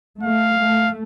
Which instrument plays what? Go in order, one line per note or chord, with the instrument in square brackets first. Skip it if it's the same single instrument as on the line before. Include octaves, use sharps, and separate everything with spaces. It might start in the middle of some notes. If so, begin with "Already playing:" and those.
[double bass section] A3 [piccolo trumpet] F5
[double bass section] A3